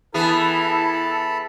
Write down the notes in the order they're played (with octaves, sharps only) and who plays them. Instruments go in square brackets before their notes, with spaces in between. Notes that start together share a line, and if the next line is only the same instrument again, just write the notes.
[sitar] E3 B3 G#4 [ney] E4 [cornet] A4 [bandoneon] A5 B5